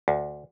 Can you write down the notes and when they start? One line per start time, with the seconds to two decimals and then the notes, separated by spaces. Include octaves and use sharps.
0.08 D2